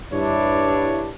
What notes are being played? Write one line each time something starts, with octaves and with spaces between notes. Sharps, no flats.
G2 D4 E4 C#5